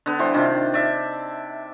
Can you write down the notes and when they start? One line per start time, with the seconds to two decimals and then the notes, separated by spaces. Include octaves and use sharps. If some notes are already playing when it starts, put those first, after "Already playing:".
0.06 D3 B3
0.19 E3 G3 C5
0.34 C3 D#3 D4 F4
0.74 D5 E5